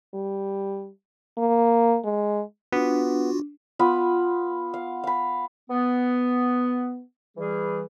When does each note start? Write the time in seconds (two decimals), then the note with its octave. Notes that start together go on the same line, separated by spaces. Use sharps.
0.14 G3
1.38 A#3
2.04 G#3
2.73 B3 D4 F4 F#4
3.79 B3 F4 B5
4.74 F5
5.04 F5 B5
5.70 B3
7.37 E3 G3 G#4